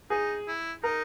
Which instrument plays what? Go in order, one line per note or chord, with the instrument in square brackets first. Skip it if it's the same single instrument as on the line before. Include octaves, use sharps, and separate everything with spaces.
[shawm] D#4 [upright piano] G#4
[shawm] E4
[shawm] D#4 [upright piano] A#4